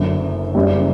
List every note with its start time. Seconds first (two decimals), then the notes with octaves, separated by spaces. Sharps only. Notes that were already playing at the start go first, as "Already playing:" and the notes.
Already playing: F#1 F#2 D3
0.55 F#1 F#2 C#3 G3